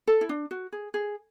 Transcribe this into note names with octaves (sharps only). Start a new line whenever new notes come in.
A4
E4
D4
F#4
G#4
G#4